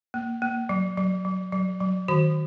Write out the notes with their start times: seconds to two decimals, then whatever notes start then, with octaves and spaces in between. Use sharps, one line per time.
0.14 A#3
0.42 A#3
0.69 F#3
0.97 F#3
1.25 F#3
1.52 F#3
1.80 F#3
2.08 D#3 F#4